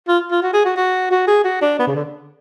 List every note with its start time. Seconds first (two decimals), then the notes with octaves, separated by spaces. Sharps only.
0.08 F4
0.31 F4
0.42 F#4
0.54 G#4
0.65 F#4
0.77 F#4
1.11 F#4
1.28 G#4
1.44 F#4
1.62 D4
1.79 B3
1.87 C#3
1.95 D3